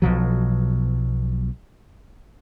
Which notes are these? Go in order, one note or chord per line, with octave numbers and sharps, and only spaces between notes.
B1 B2 F3 F#3